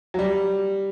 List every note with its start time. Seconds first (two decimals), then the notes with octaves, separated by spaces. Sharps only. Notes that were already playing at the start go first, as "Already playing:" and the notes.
0.14 F#3
0.19 G3